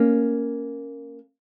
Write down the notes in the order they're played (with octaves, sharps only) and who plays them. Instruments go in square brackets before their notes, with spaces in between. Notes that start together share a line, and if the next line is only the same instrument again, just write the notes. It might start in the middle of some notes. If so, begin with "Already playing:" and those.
Already playing: [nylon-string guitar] A#3 C#4